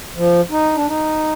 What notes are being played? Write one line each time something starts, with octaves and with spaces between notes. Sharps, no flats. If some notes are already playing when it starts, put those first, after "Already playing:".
F3
D#4
D4
D#4